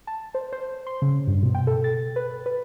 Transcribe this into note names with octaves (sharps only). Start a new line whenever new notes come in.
A5
C5
C5
C6
C#3
G2
B2
G5
A4
A6
B4
B4